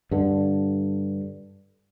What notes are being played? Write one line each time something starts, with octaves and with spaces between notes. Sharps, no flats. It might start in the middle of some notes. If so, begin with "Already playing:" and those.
G2 D3